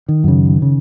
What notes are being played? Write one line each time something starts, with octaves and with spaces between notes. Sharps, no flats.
D#3
F#2 C#3
C#3